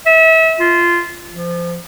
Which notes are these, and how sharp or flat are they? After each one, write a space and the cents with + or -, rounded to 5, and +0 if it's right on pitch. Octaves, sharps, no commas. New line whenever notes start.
E5 -30
F4 -15
F3 -20